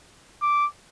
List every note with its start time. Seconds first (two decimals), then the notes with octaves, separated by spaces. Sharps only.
0.42 D6